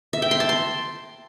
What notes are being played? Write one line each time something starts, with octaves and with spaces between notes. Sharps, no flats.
E5
G5
C6
A5
C6